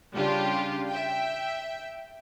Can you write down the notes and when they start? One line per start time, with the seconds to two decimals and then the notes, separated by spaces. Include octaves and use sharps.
0.14 C#3 G3 D4 F4 G4
0.89 E5 G5